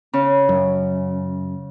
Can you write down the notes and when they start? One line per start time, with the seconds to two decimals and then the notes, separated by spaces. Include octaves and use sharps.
0.13 C#3
0.49 F#2